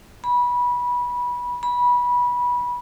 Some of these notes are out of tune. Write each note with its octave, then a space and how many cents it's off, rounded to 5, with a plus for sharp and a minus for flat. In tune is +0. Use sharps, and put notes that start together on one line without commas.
B5 -20
B5 -20